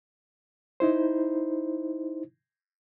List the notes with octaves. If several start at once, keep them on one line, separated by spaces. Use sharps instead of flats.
D#4 E4 C5